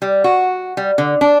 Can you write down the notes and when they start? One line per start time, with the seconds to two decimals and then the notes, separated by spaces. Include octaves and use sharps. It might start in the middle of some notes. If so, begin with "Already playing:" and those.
0.02 G3
0.24 F#4
0.77 G3
0.98 D3
1.21 D4